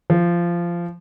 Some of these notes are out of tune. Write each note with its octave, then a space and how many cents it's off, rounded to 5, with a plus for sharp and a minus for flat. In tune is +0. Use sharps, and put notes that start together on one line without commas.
F3 -15